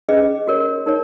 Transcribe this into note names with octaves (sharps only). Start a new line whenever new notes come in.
C#4 G#4 B4 D#5
F#4 A#4 C#5
D#4 A#4 C#5